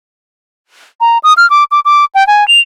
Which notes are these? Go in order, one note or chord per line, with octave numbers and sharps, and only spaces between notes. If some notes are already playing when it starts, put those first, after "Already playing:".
A#5
D#6
F6
D6
D6
D6
G5
G#5
F7